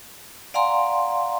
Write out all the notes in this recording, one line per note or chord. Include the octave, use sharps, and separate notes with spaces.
D5 F5 F#5 G#5 A#5 C6